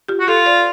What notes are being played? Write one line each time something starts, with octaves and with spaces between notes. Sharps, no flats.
F4 G4
F#4
F4 G4 A4
C5 D5